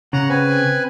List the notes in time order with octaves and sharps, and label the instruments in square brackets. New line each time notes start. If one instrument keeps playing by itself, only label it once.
[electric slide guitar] C#3 [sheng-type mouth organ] F#5 A#5
[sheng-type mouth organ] C4 B4 G#5